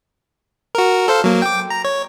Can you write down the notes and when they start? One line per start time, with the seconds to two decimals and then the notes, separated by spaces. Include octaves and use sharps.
0.75 F#4 A#4
1.08 A4 C5 F5
1.24 F#3 A#3
1.42 G5 D6
1.70 A#5
1.85 C#5